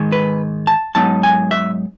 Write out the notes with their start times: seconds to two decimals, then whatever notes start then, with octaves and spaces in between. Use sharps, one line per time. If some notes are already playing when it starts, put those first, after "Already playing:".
Already playing: G#2 D#3 G#3
0.12 B4
0.67 A5
0.95 G#2 F#3 B3 D#4 A5
1.23 G#5
1.51 E5